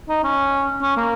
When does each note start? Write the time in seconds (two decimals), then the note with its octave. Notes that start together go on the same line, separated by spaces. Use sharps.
0.09 D#4
0.23 C#4
0.82 C#4
0.96 A#3